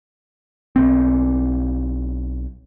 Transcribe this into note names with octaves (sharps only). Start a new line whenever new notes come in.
B1 C4